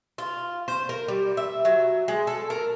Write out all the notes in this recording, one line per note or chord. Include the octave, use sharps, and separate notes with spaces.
F4
C5
A#4
G3
E5
F#3
G#3
A4
A#4